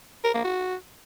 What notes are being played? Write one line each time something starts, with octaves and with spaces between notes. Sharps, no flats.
A#4
A#3
F#4